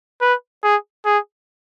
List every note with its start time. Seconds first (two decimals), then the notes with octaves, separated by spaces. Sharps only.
0.22 B4
0.64 G#4
1.06 G#4